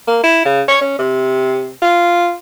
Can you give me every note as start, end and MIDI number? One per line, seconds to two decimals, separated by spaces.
0.07 0.23 58
0.23 0.43 64
0.45 0.62 49
0.68 0.80 73
0.81 0.94 61
0.98 1.70 48
1.82 2.33 65